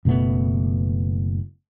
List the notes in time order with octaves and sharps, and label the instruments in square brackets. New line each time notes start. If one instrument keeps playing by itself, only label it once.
[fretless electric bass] F#1 B2 A3 B3